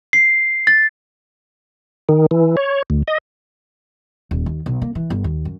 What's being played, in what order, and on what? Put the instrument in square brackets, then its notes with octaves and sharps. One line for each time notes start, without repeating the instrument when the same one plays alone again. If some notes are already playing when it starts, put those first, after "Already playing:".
[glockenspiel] C7
A6
[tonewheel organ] D#3
E3
C#5
D2
D#5
[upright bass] D#1
D#2
B1
A#3
E3
G1
D#2
F#2